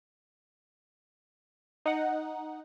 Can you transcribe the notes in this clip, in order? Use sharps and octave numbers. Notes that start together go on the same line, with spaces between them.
D#4 F#5